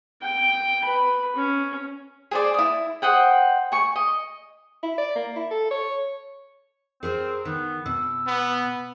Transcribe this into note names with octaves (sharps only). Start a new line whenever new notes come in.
G5
B4 B5
C#4
G#4 C5 D5
E4 D#6
C5 D#5 F#5 G5
G#5 C#6
D#5
E4
D5
A#3
E4
A4
C#5
C4 G#4 A#4 C5
D#3 B3
B2 E6
B3